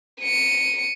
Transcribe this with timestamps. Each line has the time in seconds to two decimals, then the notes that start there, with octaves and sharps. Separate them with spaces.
0.21 C#7 D#7